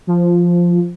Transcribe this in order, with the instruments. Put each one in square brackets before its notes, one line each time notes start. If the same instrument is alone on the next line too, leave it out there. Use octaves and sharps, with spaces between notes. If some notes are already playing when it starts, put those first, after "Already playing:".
[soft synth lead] F3